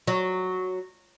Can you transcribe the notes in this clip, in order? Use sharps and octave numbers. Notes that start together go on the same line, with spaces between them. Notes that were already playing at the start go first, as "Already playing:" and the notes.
F#3